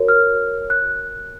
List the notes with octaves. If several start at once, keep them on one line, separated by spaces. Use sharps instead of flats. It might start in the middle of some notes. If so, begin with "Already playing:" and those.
Already playing: F#4 A#4 C#5
F6
F#6